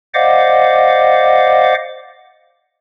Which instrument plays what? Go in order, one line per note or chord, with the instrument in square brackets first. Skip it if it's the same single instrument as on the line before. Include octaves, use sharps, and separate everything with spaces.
[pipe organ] C5 D5 D#5 F5 F#5 D6